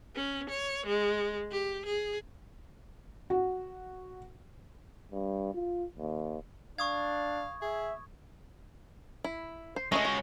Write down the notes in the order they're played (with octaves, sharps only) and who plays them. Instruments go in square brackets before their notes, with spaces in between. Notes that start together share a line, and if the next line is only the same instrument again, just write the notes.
[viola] C#4
C#5
G#3
G4
G#4
[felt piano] F#4
[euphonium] G2
F4
D#2
[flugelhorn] D4 [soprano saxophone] F5 [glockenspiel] C#6 D#6 G#6
[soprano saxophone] G#4 [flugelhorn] E5
[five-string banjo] E4
C5
[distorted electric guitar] G#3 C#4 [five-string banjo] A3 C#5 D#5
[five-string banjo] F#4